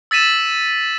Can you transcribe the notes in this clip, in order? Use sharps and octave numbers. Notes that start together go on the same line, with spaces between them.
E6 A6 B6 D#7 E7